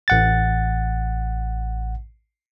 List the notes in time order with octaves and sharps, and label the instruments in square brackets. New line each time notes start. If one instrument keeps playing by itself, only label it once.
[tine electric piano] A1 F#5 A6